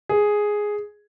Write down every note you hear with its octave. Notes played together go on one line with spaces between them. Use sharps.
G#4